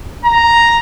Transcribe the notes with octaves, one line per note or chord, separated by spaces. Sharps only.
A#5